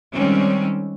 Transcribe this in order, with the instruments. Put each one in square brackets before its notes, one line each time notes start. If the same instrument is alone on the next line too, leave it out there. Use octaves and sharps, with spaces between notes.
[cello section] D#3 G3 G#3 C4 C#4